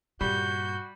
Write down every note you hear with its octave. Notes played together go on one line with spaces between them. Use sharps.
G2 A#2 G3 F#4 G6